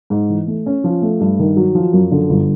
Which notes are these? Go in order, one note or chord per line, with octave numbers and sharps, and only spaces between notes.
G#2
E3
A3
C#4
F3
A3
G2
D#3
F#3
F3
F#2
D3
G1